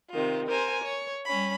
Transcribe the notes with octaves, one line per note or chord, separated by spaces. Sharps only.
C3 D#3 F4
A#4 C5 G#5
C#5
G3 C#4 B5